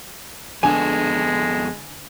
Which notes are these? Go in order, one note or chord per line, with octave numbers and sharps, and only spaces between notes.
F2 D3 G#3 B3 G#4 A4 G#5